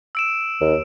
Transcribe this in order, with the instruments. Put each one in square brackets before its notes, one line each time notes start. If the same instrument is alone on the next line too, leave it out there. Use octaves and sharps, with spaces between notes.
[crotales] E6 D7 E7
[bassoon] D#2